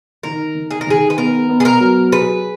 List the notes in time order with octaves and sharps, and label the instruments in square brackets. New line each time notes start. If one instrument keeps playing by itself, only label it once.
[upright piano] D#3 [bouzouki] A#4
[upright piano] D#3
[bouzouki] G#4
A#4
[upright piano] D#3 [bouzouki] G#4
[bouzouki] B4
[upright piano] B3 [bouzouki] A#4
[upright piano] B3
[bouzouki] G#4
A#4
[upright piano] F#3
[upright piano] G#4 [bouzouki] B4